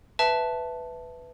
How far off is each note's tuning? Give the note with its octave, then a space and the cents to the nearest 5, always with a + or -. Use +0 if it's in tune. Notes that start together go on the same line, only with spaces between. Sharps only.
B4 +10 E5 +0 A5 +0